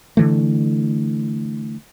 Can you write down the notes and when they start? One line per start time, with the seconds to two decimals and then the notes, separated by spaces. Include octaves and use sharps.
0.17 D3 E3 A3